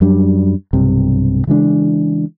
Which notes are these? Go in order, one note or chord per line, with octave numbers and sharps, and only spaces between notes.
F#2 F#3 G3 D4
B1 G2 C3
C#3 E3 G#3 D4